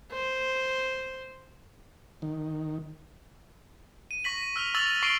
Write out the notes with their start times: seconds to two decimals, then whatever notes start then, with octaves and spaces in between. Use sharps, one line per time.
0.12 C5
2.22 D#3
4.11 D#7
4.24 C#6 A#6 B6 F#7
4.56 E6 F6 D#7 F7
4.74 C#6 E6 A6 F7 F#7
5.02 C#6 C7 D7 G7